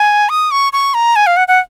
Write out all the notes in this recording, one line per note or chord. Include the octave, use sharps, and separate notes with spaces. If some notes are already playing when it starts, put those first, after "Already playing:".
Already playing: G#5
D#6
C#6
C#6
A#5
G#5
F5
F#5
F#5